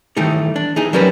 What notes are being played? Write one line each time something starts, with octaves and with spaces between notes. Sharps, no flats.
D#3 E3 G3 A3 D#4
D4
E3 D#4 G#4
F#3 G3 C#4 A#4 B4